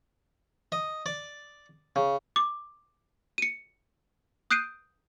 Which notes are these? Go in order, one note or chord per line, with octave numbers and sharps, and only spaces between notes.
D#5
D5
C#3
D6
C#7 D#7
D#6 F#6 G6 C7 D7 D#7